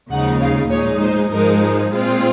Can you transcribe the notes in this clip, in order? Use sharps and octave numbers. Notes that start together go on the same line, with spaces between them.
D#2 C#3 F3 G#3 D#4 F#5
F5
A#2 G#3 D#4 C#5
C5
G#2 F3 G#3 D#4 A#4
A#2 G#3 C4 F4